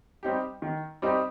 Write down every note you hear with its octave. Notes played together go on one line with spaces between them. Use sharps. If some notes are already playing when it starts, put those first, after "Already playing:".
G3 C4 D#4 G4
D#3
G3 C4 D#4 G4